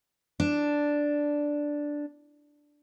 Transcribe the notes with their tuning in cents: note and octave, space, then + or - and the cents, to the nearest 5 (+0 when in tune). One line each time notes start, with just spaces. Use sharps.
D4 +0